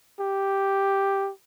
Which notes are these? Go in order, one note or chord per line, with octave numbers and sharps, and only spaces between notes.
G4